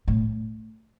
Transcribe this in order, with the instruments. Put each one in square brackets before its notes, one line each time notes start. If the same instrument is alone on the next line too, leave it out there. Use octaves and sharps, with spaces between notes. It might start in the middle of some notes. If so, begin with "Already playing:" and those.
[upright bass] A2